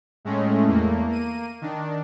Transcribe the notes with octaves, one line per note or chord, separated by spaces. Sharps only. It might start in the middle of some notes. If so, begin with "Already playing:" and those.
A2 G#3 A3 C#4
E2 A3 A#3
A#3 D#7
D#3 D4